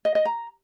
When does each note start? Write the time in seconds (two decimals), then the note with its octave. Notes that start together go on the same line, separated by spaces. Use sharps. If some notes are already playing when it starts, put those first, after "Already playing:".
0.05 D#5
0.15 D#5
0.25 A#5